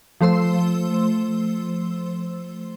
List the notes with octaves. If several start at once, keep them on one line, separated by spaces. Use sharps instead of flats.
F3 A3 C5 C6 E6